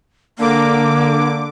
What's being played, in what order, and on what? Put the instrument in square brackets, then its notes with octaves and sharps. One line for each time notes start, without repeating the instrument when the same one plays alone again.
[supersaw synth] D3 D6 [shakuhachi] A#3